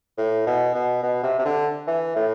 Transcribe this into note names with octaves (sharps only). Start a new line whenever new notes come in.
A2
B2
B2
B2
C3
C3
D3
E3
A2